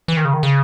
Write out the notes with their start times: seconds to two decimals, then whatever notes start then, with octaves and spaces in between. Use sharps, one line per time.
0.08 E3
0.17 D#3
0.25 C#3
0.34 D#3
0.43 C#3